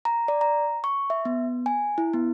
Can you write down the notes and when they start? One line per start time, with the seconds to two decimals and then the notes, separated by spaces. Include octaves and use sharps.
0.05 A#5
0.28 D5
0.41 A#5
0.84 C#6
1.10 E5
1.25 B3
1.66 G#5
1.98 E4
2.13 B3